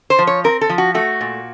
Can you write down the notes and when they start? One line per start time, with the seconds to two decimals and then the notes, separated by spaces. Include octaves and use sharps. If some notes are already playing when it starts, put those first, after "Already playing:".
0.10 C5
0.19 F3
0.27 C#5
0.44 C4 A#4
0.61 A4
0.70 F3
0.78 F#4
0.95 A3 F#4
1.21 A#2